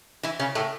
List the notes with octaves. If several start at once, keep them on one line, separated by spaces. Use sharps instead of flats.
E3 E4
C#3 C#4
A2 A3